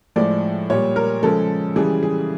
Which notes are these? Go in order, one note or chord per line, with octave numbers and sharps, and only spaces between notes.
A2 F3 G#3 D5
A#2 G3 C#5
A#4
C#3 F3 G#3 A4
C#3 E3 G3 G#4
G#4